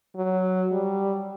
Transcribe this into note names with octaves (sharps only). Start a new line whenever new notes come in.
F#3
G3